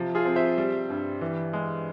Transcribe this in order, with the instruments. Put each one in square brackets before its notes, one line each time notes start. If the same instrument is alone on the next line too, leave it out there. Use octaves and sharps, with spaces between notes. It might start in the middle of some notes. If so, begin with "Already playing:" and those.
Already playing: [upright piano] C3 F3
F4 G#4
C4
C5 E5
G3
G2
E3
G#3